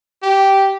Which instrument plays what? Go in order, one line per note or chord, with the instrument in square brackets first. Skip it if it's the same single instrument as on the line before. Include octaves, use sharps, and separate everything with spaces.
[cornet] G4